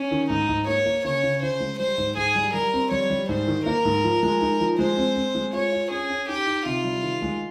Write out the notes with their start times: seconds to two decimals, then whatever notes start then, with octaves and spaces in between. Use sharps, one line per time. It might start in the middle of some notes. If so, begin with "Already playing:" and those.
Already playing: C#4
0.11 D#3
0.30 G#2 D#4
0.49 G#2
0.67 A#3 C#5
0.86 A#3
1.04 C#3 C#5
1.23 C#3
1.42 C#3 C5
1.60 G#3
1.79 G3 C5
1.98 G#2
2.17 G#2 G#4
2.35 G3
2.54 G3 A#4
2.74 C4
2.91 G3 C#5
3.10 G3
3.29 G#2 C5
3.48 D#3
3.66 A#3 A#4
3.85 G#2
4.04 F3
4.23 G#3
4.41 D#4
4.60 F3
4.78 G#3 C5
4.97 C4
5.16 C4
5.35 G#3
5.53 F4 C#5
5.72 F4
5.91 C#4 G#4
6.10 C#4
6.28 D#4 G4
6.47 D#4
6.66 C3 F4
6.84 G3
7.03 D#3
7.22 G#3